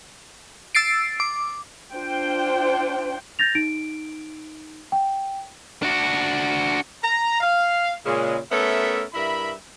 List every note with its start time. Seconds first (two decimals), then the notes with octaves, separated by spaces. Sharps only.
0.75 E6 A6 C7 D7
1.20 D6
1.94 D4 F4 C5 G5
3.39 G6 A6 A#6 F7
3.55 D#4 D7
4.92 G5
5.83 D4 F#4
7.04 A#5
7.41 F5
8.05 A#2 C#3 G#3
8.51 A3 B3 C#4 A4 A#4 E5
9.14 G2 E4 A#4 E5 B5